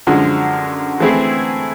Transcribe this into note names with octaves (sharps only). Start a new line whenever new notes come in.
F#2 D3 F3 G#3
E3 A3 C4 E4 G#4